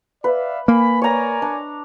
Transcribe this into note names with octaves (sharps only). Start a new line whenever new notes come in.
B4 D5 E5 F5
A#3 G#5 B5
A#4 C#5 D5 G#5 A#5
D4